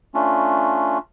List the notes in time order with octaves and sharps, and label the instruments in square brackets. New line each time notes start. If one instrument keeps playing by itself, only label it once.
[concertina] A3 C#4 D4 F4